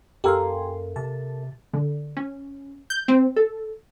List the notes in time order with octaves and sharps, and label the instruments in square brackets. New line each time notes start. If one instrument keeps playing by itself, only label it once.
[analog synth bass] F#2 [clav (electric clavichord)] A#3 A4 A#4 [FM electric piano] G4 G#5 C6
[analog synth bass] C3 [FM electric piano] A5
[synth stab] D3
C#4
G6
C4
A4